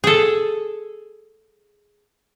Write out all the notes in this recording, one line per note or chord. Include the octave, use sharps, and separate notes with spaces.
G#4 A4